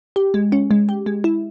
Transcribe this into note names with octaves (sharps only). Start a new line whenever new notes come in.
G4
G#3
C#4
G#3
G4
G#3
E4